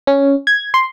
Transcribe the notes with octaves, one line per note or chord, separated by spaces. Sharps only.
C#4
G#6
C6